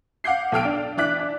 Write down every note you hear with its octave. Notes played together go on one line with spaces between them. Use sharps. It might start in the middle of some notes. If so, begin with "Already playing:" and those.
F5 F#5 D6 G6 C7
B1 A4 G5 F6 D7
D4
E3 D4 D6 F#6 B6
D4